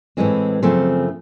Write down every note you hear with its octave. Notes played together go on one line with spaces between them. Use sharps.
A2 E3 G#3 C4 G#4
F#2 C#3 F3 A3 C4